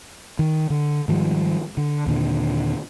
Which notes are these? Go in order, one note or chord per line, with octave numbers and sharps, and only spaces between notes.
D#3
D3
G#2 D#3 F3 G3
D3
D#2 A#2 D3